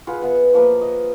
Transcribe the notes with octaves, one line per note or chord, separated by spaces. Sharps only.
F4 G#4 B4 F#5
B3 E5 F#5
F3 A#3 B4
D#5